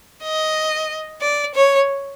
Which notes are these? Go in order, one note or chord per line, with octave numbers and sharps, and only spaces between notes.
D#5
D5
C#5